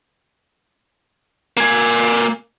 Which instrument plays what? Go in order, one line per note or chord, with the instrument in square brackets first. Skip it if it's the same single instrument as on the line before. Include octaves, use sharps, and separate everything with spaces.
[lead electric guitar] A#3 G#5